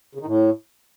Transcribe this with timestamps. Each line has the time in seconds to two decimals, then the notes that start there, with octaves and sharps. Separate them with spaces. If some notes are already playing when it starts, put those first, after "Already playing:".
0.15 C#3
0.21 D#3
0.26 A2